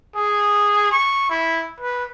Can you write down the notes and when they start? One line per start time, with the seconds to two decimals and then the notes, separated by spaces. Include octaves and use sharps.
0.15 G#4
0.91 C#6
1.30 E4
1.80 B4